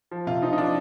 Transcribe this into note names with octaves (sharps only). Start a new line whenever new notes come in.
F3
C3 F4
F3 D#4
D#4
F3 D4